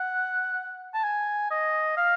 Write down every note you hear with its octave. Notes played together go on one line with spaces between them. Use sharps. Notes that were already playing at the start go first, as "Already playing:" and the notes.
Already playing: F#5
A5
G#5
D#5
F5